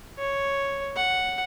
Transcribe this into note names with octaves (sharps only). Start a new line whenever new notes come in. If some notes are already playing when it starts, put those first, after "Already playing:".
C#5
F#5